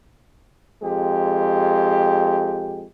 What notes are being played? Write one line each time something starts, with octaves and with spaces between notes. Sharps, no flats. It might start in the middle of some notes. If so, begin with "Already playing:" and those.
F2 G#3 G4